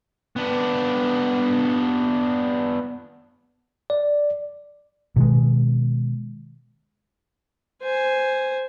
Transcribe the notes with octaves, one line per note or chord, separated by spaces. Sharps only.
B3 D4
D5
B2 D#3 G#3
C5 G#5